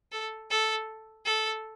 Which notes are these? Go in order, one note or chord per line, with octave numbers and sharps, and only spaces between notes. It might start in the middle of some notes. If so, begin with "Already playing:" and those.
A4
A4
A4